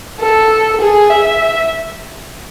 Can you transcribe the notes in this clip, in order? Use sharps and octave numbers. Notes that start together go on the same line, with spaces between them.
A4
G#4
E5